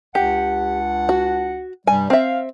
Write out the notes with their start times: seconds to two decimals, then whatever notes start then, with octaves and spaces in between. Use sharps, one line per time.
0.15 C#2 D4 G4 F#5
1.09 F#4
1.87 G2 C3 G3 G#5
2.10 C4 E5 F5